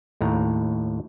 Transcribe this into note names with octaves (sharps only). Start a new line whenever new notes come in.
D#2 A2 A#5